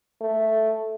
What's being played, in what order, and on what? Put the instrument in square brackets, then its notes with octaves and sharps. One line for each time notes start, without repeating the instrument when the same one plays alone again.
[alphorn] A3